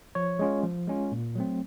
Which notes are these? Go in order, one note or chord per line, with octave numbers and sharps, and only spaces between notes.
F3 C#5
G#3 C#4 F4
F3
G#3 C#4 F4
A#2
F#3 A3 C4